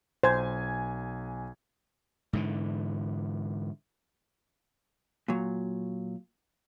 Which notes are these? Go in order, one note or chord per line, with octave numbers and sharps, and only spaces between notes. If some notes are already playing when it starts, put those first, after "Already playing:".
B1 C5 G#5 G#6
G#2 D3 E3
A#2 F#3